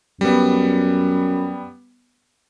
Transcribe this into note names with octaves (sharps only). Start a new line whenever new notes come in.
F#2 G3 B3